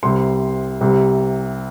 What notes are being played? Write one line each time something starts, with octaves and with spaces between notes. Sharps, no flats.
C2 C3 C6
C2 C3